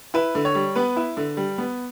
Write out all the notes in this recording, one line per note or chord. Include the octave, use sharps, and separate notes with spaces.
E4 B4
D3
C#5
G3
B3 B4
E4
D3
G3
B3